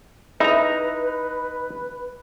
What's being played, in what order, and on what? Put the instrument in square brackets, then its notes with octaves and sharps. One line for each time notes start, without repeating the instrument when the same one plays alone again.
[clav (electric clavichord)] D#4 A#5 [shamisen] E4 [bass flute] B4